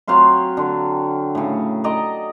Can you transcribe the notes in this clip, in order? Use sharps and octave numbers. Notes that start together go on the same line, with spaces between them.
F#3 C4 F5 C6
D3
A2 C#3
D5 D#5 A#5